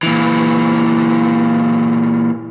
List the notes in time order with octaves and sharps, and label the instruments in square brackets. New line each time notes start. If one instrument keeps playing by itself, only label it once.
[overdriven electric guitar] A#2 E3